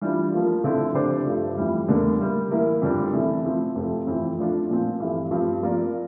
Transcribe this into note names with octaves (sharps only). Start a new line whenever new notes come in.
E3 G3 D4 F4
F3 A#3 F4
D3 F3 A3 C4 E4
D3 A3 D4 G4 C5
G2 F3 A3
F2 E3 G3
E2 D3 G3 A#3 D4
A2 G3 A#3
E3 A#3 E4 A#4
F2 D3 G3 D4 G4
C3 E3 A3
F3 C4 E4
F2 C3 F3 A3
F2 E3 A3 C4
A2 F3 A3 D4 F4
A#2 F3 C4
G2 E3 A3
G2 F3 C4 F4
F3 A#3 F4 A#4 D5